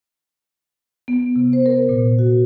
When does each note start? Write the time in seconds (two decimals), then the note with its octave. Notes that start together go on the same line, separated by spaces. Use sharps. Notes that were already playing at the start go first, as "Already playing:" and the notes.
1.08 B3
1.36 C3
1.53 C5
1.66 A#4
1.89 A#2
2.19 F#4